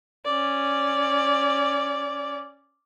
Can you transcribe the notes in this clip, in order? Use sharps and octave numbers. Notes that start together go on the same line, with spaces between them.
C#4 D5